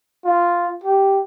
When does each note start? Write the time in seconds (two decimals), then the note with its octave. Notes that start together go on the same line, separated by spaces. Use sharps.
0.25 F4
0.83 G4